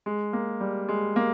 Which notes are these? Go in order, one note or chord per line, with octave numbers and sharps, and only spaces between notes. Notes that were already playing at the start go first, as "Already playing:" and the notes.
G#3
A#3
G3
G#3
A#3